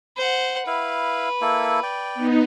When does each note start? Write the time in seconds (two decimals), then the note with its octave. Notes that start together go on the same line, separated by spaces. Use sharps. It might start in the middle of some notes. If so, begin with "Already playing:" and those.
0.17 C5 F#5
0.67 E4 B4 F5
1.41 A#3 E4 A4
1.83 D5 G5
2.15 B3 D#4